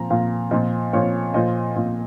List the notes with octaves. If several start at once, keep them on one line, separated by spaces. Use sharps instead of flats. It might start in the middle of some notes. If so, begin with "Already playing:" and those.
Already playing: A#2 F3 A#5
A#2 F3 F5
A#2 F3 D#5
A#2 F3 C#5
A#2 F3 D#5
A#2 F3